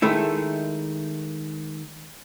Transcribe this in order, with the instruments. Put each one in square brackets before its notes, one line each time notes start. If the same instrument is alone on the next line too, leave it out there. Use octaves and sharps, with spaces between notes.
[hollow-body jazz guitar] D#3 G#3 A3 E4